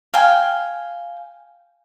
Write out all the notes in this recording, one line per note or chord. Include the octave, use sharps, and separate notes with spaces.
F5 G5 G#5